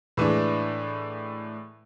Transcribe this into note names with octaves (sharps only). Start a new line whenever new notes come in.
A2 E3 G#3 D4